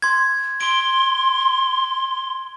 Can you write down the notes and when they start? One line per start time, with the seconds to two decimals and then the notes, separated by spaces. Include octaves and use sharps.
0.02 C6 G#6
0.61 C6 D7